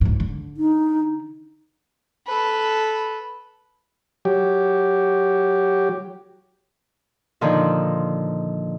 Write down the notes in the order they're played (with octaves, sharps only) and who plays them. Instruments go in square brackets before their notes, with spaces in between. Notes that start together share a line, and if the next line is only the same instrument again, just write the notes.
[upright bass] C#2 G#2
D3
[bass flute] D#4
[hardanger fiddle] A4 B4
[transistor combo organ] F#3 G4
[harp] A#2 D3 D#3 F3 D#4